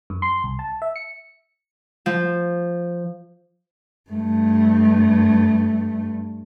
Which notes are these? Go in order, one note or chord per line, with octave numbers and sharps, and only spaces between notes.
F#2
C6
C2
A5
E5
C#7
F3
G2 A3